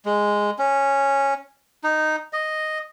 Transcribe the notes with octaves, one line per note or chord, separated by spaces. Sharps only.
G#3
C#4
D#4
D#5